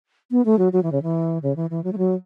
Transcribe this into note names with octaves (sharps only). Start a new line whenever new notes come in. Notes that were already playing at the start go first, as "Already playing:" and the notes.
B3
A3
F#3
F#3
E3
C#3
E3
C#3
E3
E3
F#3
A3
F#3